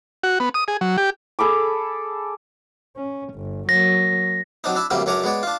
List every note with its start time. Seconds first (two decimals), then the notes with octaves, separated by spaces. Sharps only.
0.23 F#4
0.40 B3
0.54 D#6
0.68 G#4
0.81 F#3
0.98 G4
1.39 G#4 A4 B5 D6
2.96 C#4
3.34 G1
3.69 F#3 A#3 A#6
4.64 F#3 C4 D4 D#4
4.76 D4 E4 E5
4.90 F#2 A2 D3 G3 A#3 C4
5.06 C#2 F#2 D4 C#5 D5 A#5
5.24 G#3 B3 C#5 D5
5.43 D4 F4